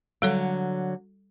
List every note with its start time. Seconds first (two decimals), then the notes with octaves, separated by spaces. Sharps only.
0.22 D3 F#3 G3 A4 C#5